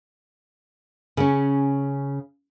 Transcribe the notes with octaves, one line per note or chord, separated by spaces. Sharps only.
C#3 C#4